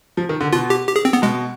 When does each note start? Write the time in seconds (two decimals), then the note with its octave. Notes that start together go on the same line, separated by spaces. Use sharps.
0.17 F3
0.29 D#3
0.41 D3
0.52 B2 F4
0.70 G4
0.87 G4
0.96 G#4
1.05 C4
1.13 B3
1.22 B2 G#3